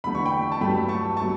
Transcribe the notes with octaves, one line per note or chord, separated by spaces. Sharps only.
E2 D3 A3 B5
C#6
G5 B5
A5
G2 F#3 A3 G5 B5
A5 C#6
F#3 A3 A5 C#6